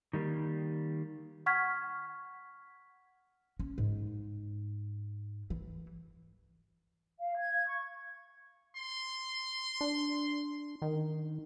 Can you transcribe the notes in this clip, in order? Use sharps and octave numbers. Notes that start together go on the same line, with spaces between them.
D#3 G3 A#3
F#5 C#6 F6 G#6 B6
C#4
G#2
E3
F5
G#6
C#6
C6
D4
D#3